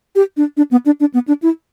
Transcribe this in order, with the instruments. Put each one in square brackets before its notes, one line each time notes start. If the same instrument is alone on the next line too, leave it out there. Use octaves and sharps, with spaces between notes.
[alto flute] G4
D4
D4
B3
D4
D4
B3
D4
E4